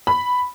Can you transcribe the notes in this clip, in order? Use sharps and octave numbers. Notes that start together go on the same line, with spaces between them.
B5